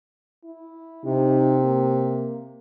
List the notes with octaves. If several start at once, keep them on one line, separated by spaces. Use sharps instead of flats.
E4
C3 D#4
A#3